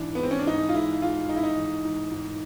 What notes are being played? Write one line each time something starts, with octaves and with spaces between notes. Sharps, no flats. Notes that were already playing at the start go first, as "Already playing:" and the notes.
Already playing: G#2 E3 D4
B3
G#3 C4
C#4
D4
G#2 D#4
F4
G#3 E4
G#2 F4
G#3 D#4
E4
D#4
E3
G#2
G#2